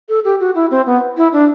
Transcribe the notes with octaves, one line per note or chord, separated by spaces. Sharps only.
A4
G4
F#4
E4
C4
B3
E4
D4